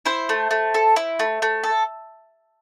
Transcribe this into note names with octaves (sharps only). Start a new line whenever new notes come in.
E4 C5
A3
A3
A4
E4
A3
A3
A4